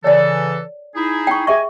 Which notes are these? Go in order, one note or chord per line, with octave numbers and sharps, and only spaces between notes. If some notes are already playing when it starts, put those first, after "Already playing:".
C#3 E3 A4 C#5 D5
D#4 E4 G#4
G5 C#6
G#4 D#5 E5 G#5 C#6